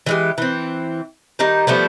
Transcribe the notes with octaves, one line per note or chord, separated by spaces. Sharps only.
E3 G#3 G4
E3 C4
D#3 G3 D#4
F3 G3 A3 B3